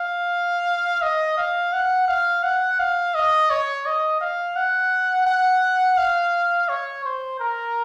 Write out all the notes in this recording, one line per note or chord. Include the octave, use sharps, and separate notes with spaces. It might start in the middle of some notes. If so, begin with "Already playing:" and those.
Already playing: F5
D#5
F5
F#5
F5
F#5
F5
D#5
C#5
D#5
F5
F#5
F#5
F5
C#5
C5
A#4